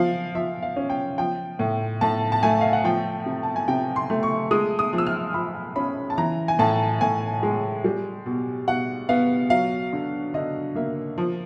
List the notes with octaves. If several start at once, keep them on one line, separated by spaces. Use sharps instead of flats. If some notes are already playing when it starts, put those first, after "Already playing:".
Already playing: F3 F5
F3 E5
F5
C#4
G5
F3 G5
A2
A2 A5
A5
A3 G#5
F5
F#5
F3 G5
C3
A5
G#5
C3 G5
C6
A3
C#6
G#3 D#6
D#6
F3
E6
F6
F3 B5
C#4 B5
A5
E3 A#5
G#5
A2 A5
A2 G#5
G#3
G3
B2
B2 F#5
B3 F5
F#3 F5
D3
D3 D#5
A#3 E5
F3